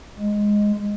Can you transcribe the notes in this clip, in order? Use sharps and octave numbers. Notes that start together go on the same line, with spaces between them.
G#3